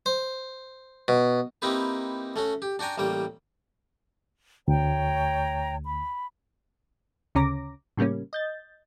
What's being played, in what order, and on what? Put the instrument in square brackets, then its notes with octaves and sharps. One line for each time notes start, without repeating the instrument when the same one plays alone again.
[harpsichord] C5
B2
A#3 C4 D#4 E4 G4 B4
A3 C#4 F#4
G4
D4 F#4 G5 G#5 A#5
A1 G3 A#3 G5
[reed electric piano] D2 [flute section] C#5 G5 A#5
[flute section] B5
[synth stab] D2 C#3 C#4 A#5 D6 A#6
A2 C#3 G3 A#3 C#4
D#5 G6 A6